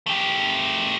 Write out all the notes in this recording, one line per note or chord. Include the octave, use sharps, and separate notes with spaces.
A3 G4